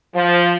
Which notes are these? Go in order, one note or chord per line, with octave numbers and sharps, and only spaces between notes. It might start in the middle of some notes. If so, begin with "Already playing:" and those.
F3